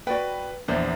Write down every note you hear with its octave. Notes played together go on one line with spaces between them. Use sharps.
F#4 B4 D5 G5
A#1 E2 D4 C5 D5 E5